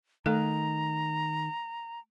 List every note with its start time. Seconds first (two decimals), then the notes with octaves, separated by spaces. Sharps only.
0.26 D#3 A3 A4 A#5